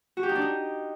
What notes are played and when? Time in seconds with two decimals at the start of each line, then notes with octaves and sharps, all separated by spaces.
0.17 F#4
0.23 G4
0.29 D#4
0.35 D4
0.41 D#4